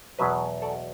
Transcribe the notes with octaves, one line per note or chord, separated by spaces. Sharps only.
E2 B2 F#3 B4 E5
A4 D5